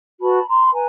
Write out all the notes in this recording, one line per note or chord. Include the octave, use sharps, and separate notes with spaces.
F#4 B4 A5 B5
A#5 C6
B5
B4 G#5 A#5